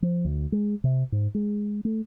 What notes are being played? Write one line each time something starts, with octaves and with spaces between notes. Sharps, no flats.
F3
D2
G#3
C3
G#2
G#3
A3